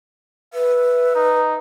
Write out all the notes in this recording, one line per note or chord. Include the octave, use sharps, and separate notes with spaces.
B4 E5
D#4